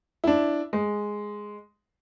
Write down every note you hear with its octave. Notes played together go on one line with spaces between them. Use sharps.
D4 E4
G#3